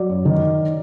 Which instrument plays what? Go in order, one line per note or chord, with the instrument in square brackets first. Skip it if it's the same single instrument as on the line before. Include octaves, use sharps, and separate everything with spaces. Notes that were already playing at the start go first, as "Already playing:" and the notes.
Already playing: [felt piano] F#3 D5
F#2
D#3